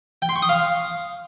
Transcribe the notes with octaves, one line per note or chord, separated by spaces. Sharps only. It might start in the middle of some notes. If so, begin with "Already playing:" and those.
G5
C6
C#6
D#6
F5